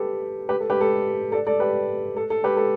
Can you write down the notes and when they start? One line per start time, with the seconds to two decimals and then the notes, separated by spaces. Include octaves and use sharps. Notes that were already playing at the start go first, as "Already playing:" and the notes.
Already playing: G4 A4 B4
0.49 G4 B4
0.60 A4
0.70 G4 B4
0.81 A4
1.32 A4 D5
1.47 A4 D5
1.60 G4 B4
2.17 A4
2.30 A4
2.44 G4 B4
2.57 A4